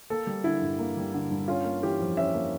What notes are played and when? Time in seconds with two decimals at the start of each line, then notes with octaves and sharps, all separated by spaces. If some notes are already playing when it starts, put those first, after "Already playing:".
0.10 A#3 A4
0.27 G3
0.44 D3 E4
0.61 G2
0.79 A#3
0.97 G3
1.13 D3
1.31 G2
1.48 C#4 F4
1.65 A#3
1.83 E3 G4
2.00 F2
2.17 C#4 E5
2.34 A#3